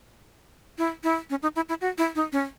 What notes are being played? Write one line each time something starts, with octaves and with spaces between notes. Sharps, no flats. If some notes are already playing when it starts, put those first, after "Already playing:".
E4
E4
C#4
D#4
E4
E4
F#4
E4
D#4
C#4